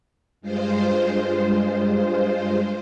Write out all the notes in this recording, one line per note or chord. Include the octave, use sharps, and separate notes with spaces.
G2 G#3 F4 C5